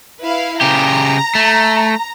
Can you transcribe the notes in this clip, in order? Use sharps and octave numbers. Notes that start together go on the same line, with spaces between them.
E4 B4 F5
C#3 G4 A#5
A3